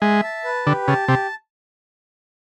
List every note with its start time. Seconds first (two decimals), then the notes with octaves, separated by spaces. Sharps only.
0.02 G#3 E5
0.24 A5
0.44 B4
0.66 D3 G4
0.88 C#3 A5
1.08 C3 G4